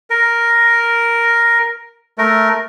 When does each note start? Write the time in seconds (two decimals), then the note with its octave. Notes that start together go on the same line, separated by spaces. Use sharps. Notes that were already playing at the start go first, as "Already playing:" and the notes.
0.10 A#4
2.18 A3 A#4